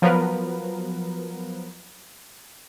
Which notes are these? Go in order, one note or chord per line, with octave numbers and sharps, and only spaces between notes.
F3 F#3 B3 A#4 B4